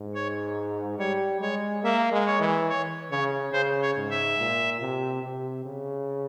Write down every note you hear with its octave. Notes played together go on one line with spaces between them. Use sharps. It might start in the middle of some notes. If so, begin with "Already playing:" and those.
Already playing: G#2
C#5
G3 C#5
G#3 C#5
A#3 E5
G#3
C#5
E3
C#5
C#3 C#5
C#3 C5
C#5
G#2
E5
A#2
C3
C3
C#3